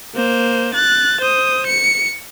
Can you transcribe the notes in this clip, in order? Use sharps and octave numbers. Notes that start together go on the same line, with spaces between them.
A#3 C5
F#6 A6
C5 D#6
C#7